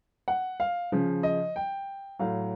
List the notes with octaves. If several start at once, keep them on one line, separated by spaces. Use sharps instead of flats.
F#5
F5
C#3 F3
D#5
G5
A2 F#3 F5